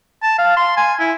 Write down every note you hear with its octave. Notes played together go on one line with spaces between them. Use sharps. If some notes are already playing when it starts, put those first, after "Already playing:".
A5
F5
C6
G#5
E4